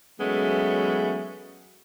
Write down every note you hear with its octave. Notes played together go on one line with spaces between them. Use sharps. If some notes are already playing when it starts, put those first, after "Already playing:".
E3 F#3 G#3 A3 B3 C#4